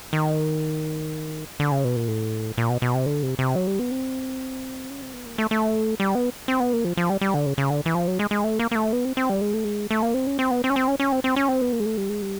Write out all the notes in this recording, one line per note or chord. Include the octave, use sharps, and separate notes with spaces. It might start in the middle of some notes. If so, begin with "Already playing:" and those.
D#3
D3
C#3
B2
A#2
A2
A#2
B2
B2
C3
D3
C3
C3
F#3
G3
B3
C4
C#4
C4
B3
A#3
A3
A3
G3
B3
C4
B3
A#3
F3
F3
G3
G3
D3
C#3
C#3
D3
E3
F3
F#3
G#3
G#3
A3
A#3
A#3
A3
B3
C4
C4
G3
G#3
A3
G#3
A3
A#3
C4
C#4
C4
B3
C4
C#4
C4
C#4
C#4
C4
C4
C#4
C4
B3
A#3
G#3
A3
G3
G#3
G3